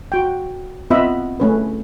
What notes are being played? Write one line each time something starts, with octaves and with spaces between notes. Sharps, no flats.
F#4 G5
B3 C4 F4 D#5 E5 B5
A3 C#4 B4